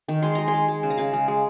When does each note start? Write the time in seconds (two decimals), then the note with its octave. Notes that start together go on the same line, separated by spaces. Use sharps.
0.08 D#3
0.22 G#3 C6
0.35 G#3 A#5
0.48 G#5 C6
0.54 G#3
0.68 G#3
0.83 C#3
0.90 A#5
0.97 C#3 F5 G#5
1.13 G#3
1.28 G#3